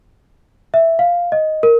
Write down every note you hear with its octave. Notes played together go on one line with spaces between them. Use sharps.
E5
F5
D#5
A#4